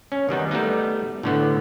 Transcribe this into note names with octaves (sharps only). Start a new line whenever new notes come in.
C#4
D#3 G3 B3 D#4
G3 A3 B3 D#4
A2 D3 B3